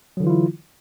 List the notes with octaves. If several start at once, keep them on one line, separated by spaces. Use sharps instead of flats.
D3 E3 F#3 E4 F4